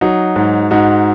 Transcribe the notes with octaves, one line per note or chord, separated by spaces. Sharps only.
F#3 D#4 F#4
G#2
G#2 D#4 F#4